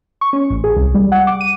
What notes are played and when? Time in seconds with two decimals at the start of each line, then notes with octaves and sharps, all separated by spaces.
0.21 C#6
0.33 C#4
0.50 A1
0.64 G#4
0.76 C2
0.94 G3
1.12 F#5
1.27 D6
1.41 D#7